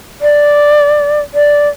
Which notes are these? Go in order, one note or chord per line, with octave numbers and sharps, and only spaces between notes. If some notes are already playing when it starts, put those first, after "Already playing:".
D5
D5